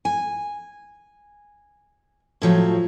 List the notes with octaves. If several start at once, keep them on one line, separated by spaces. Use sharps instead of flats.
G#5
A2 F3 F#3